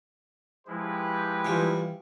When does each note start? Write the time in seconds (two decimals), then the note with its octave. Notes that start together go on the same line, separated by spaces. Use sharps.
0.67 F3 G#3 E4 G4 B4
1.45 E3 G3 F4